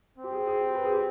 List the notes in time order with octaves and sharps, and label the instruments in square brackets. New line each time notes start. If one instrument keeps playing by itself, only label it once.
[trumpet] C4
[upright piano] G4
G#4
G#4
G4
B4
G#4
G4